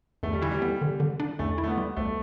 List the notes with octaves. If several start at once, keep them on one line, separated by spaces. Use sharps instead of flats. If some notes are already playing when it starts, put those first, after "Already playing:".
E2 A3
G3
E3 E4
G3
B3
D3
D3
D4
E2 A3
E4
A3
B3
G3
D2 A3